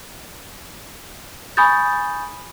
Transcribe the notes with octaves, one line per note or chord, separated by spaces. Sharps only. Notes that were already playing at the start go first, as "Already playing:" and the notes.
G#5 B5 C#6 D#6 G6 A6